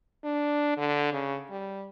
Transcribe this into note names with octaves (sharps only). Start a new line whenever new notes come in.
D4
D3
C#3
G3